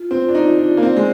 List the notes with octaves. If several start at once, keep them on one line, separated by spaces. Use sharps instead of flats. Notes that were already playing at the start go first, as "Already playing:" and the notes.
Already playing: F4
C4 F4
D4
D#4 F4
D4 F4
A#3
C4 D5
G#3